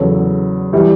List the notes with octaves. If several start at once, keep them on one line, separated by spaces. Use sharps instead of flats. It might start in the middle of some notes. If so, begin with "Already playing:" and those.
Already playing: E2 C#3 F#3 A4
E3 G3